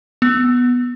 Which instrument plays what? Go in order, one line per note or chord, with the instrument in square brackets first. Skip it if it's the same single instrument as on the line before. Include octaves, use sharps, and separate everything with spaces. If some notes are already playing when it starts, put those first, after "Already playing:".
[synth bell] B3